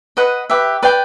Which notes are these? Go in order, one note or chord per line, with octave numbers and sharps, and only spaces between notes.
B4 D#5 F#5
G4 B4 E5
B4 D5 G5